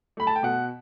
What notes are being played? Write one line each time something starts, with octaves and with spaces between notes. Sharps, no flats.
A3 B5
A5
G5
B2 F#5